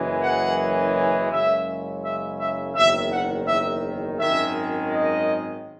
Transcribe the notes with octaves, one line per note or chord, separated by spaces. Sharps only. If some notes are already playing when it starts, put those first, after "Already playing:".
Already playing: F#1 F#2 E3 G#3
F#5
F#1 F#2 C#3 G#3 E5
E5
E5
F#1 E2 D#3 E5
F#5
E5
G#1 F#2 D#3 G#3 E5
D#5